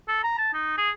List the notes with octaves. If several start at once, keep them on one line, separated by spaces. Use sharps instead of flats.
A4
A#5
A5
D#4
G#4